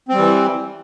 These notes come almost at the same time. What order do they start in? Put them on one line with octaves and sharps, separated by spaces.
C4 G3 E3